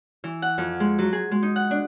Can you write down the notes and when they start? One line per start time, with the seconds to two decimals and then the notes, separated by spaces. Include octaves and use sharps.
0.24 E3
0.42 F#5
0.58 F2
0.80 G#3
0.99 F#3
1.13 G#4
1.31 G#3
1.43 D#4
1.56 F#5
1.71 D4